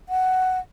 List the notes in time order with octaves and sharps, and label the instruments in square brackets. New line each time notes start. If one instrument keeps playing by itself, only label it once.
[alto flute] F#5